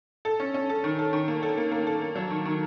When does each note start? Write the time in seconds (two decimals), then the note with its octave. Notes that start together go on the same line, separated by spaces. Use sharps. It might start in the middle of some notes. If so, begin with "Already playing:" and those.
0.25 A4
0.40 C#4
0.54 C#4
0.69 A4
0.84 D#3
0.99 A4
1.13 D#3
1.28 A#3
1.43 A4
1.57 A#3
1.72 A#3
1.87 A4
2.01 A#3
2.16 F#3
2.30 D#3
2.45 D#3